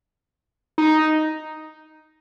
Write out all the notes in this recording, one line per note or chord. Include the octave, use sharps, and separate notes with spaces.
D#4